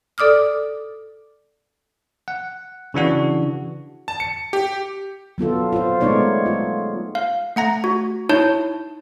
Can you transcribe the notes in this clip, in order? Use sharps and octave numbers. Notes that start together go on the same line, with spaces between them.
A4 D5 D6 D#6 F6
F#5
C#3 E3 D4 F#4
A5
C#7
G4
F#3 B3 F4 A4
F4 C5
G#3 A3 B3 D#4 C#5 D5
F4
F5
A3 F#5 A#5 A#6
F#4
D#4 E4 C#5 A5 G6